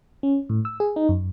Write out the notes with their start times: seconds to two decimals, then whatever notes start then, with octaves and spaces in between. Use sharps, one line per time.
0.23 C#4
0.49 A2
0.65 E6
0.80 G#4
0.96 D#4
1.09 F#2